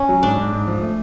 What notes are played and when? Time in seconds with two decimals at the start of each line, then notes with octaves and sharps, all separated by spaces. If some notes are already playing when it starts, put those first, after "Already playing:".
Already playing: C#4
0.09 F#3
0.23 G#2 D4
0.38 G#2
0.52 G#2
0.67 F3
0.82 A3